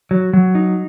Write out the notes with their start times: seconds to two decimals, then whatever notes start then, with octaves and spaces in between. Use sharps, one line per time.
0.11 F#3
0.33 F#3
0.55 D#4